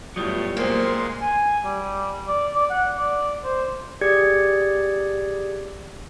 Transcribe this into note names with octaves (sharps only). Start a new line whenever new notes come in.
E2 A2 F#3 G3 F4 D#6
A#2 G#3 A#3 C4 C6
G#5
G3
D5
D5
F#5
D5
C5
G4 G#4 D5 G#6 C#7